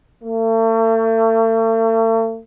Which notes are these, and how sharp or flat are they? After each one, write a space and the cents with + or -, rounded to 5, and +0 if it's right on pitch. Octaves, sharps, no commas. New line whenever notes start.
A3 +40